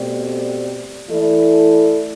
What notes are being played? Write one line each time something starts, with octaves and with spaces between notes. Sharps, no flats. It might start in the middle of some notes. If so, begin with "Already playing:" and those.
Already playing: B2 A3 C4 G4 D5
E3 A3 E4 A4 D5